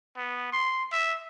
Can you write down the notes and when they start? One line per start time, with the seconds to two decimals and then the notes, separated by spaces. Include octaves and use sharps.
0.17 B3
0.53 C6
0.92 E5